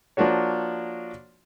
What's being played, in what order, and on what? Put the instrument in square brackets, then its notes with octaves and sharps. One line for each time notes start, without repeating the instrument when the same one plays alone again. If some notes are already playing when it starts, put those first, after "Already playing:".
[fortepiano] F3 A#3 D4 F#4 C#5